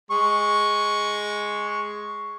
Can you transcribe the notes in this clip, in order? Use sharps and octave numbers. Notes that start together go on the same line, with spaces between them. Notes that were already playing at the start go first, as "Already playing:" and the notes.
G#3 C#6